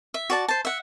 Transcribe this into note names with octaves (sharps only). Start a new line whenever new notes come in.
E5
F#4 D5 A5
C5 A5
E5 F#5